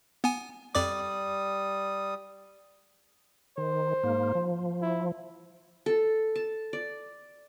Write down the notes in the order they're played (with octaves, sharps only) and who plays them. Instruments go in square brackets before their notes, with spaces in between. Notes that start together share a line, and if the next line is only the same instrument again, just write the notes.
[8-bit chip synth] B3 G#5
[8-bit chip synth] F2 D5 D6 [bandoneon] G3 D#6
[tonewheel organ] D#3 [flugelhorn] C5
[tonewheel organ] G#2 A#3
F3
[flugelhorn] E4
[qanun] A4
A5
D5